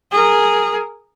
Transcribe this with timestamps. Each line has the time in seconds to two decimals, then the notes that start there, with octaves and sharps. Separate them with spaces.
0.12 G#4 A#4